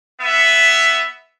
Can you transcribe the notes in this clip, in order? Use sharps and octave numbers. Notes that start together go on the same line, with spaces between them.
B3 E5